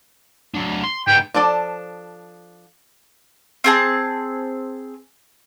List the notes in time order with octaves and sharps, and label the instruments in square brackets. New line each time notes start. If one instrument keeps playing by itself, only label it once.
[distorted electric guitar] F#3 D4
C6
[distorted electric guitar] G#2 B3 [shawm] G5
[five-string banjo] F3 D4 A4 D5
[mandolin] C4 G#4 A5